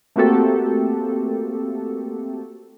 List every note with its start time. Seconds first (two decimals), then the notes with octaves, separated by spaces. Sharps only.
0.16 A3 A#3 C4 F#4 G4 A4